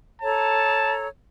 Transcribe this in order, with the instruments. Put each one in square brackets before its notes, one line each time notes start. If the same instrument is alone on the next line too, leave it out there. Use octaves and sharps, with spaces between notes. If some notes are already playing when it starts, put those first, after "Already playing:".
[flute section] A4 C#5 A#5 [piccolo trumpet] A5